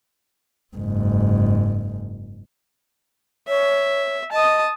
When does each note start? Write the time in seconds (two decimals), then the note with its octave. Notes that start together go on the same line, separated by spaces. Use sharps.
0.76 F#1 G#2
3.48 C#5 E5
4.32 D#5 A5 D#6